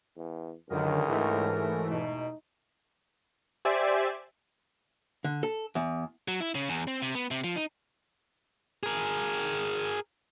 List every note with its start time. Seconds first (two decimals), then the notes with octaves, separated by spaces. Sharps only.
0.16 E2
0.70 C#2 F#2 D3 D#3 F#3 G#4 A#4
1.08 G#2 E3 A3
1.90 E2 B2 D#4
3.65 G4 C5 D5 E5 G#5
5.24 D3
5.43 A4
5.75 E2
6.28 F#3
6.40 E4
6.55 C#3
6.69 E2
6.88 C4
7.02 C3
7.15 B3
7.31 C3
7.44 F3
7.56 D#4
8.83 G#4 A#4